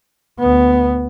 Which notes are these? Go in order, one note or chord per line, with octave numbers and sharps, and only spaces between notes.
D2 B3